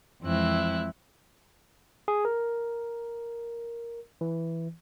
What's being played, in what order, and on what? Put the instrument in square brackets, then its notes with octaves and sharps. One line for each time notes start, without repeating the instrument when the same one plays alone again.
[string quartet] F2 E3 G#3 C4 E4 F#6
[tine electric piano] G#4
A#4
E3